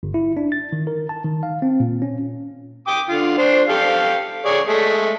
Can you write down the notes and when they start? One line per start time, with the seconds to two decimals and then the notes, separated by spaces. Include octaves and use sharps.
0.03 G1
0.14 E4
0.37 D4
0.52 A6
0.72 D#3
0.87 A#4
1.09 A5
1.25 D#3
1.43 F5
1.62 C4
1.80 A#2
2.02 C#4
2.87 G5 D6 D#6
3.09 D3 F4
3.38 D4 C5
3.69 G4 A4 F5
4.45 G#4 C#5 D5
4.67 G#3 A3